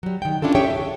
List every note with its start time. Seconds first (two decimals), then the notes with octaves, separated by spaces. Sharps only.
0.03 F#3 G3
0.22 D#3 G5
0.42 C#4 D4 E4 F4 A4
0.55 G4 G#4 C#5 E5 G5
0.70 A4